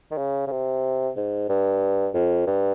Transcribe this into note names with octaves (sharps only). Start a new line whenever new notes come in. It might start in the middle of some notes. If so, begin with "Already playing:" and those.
D#3
C#3
C#3
C3
G#2
G2
F2
G2